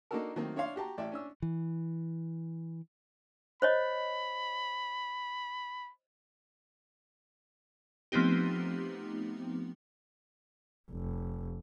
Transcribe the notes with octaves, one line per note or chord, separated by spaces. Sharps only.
A#3 D4 D#4 F#4 A4 A#4
D#3 F#3 A3 A#3 C4
D4 C#5 E5 F5 C6
F#4 G4 A5 A#5
A1 D5 E5 G5
C#4 D4 E6
E3
C5 C#5 D#5 B5
F3 A3 B3 C4 D#4 G4
F1